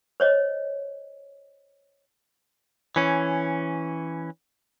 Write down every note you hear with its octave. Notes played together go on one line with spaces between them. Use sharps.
C5 C#5 D#5
E3 C#4